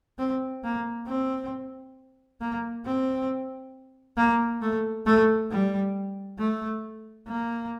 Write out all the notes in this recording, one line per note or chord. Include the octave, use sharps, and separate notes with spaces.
C4
A#3
C4
A#3
C4
A#3
A3
A3
G3
A3
A#3